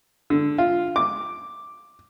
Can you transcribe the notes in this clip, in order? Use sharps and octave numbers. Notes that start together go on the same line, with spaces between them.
D3
F4
D6